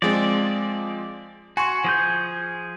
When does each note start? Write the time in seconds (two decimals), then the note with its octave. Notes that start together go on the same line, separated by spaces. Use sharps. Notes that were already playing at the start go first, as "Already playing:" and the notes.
0.02 F3 G#3 C4 D5
1.57 F#4 G#5 C6 C#6
1.84 F3 G#4 G6